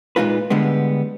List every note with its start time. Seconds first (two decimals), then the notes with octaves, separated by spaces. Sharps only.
0.16 A#2 G#3 D#4 F4 B4
0.50 D3 G3 G#3 B3